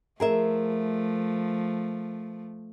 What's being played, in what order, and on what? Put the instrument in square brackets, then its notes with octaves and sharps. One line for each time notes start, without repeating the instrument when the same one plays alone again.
[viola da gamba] F3 A3 [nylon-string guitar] G#4 A#4 E5